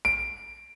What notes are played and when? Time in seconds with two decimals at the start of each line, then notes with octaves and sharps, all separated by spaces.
0.05 D7